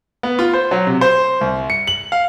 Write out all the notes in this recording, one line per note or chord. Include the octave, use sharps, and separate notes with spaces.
B3
F4
C5
F#3
C3
C5
C2
C#7
F#7
F5